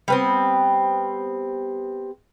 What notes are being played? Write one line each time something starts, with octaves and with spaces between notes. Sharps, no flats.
G3 B3 C4